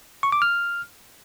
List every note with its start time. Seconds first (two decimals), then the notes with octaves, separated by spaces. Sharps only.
0.23 C#6
0.32 D6
0.42 F6